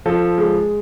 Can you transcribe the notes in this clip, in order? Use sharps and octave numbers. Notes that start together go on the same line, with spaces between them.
F3 A4
G#3